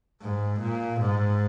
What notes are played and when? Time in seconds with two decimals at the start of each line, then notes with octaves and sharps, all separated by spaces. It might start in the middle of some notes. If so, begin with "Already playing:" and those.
0.22 G#2
0.61 A#2
1.01 G#2